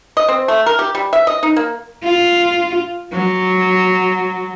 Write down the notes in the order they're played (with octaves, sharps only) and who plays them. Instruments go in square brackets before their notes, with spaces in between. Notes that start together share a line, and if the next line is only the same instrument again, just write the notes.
[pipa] D#5
C4
A3
A#4
G4
G3
E5
D#5
D#4
A#3
[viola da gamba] F4
F#3